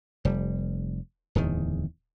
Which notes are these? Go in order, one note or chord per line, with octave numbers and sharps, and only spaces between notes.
F1 G3
D1 E2 D#3